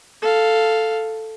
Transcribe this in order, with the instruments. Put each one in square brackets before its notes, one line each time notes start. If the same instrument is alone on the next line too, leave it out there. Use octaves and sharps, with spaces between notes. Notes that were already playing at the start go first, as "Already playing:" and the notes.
[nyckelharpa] A4 F5